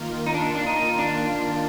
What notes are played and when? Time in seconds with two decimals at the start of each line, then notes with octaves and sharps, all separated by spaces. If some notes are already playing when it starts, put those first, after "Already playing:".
Already playing: D#3 A#3 F4
0.26 D#4
0.34 D4
0.56 D4
0.66 D#4
0.99 D4